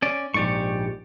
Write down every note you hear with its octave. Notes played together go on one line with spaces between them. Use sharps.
C#4 D5
A#1 G#2 G4 D5 C#6